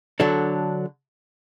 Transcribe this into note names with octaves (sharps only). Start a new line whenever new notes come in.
D3 F#3 D4 A4